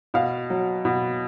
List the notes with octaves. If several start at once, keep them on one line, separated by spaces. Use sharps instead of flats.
B2 F5
F#3
B2